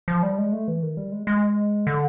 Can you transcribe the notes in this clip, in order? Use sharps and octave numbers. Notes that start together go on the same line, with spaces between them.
F3
G3
G#3
A3
E3
D#3
G3
G#3
G#3
D3